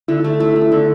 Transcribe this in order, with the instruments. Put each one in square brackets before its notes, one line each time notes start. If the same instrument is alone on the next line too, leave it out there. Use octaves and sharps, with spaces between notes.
[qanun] D3 [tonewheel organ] E4
[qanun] A3
[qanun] A3 [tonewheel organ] E4
[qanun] A3
[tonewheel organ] E4
[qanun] D3